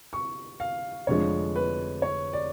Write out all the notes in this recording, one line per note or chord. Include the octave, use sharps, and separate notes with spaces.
C#6
F5
F1 F2 D3 F3 G#3 C#5
B4
C#5
D5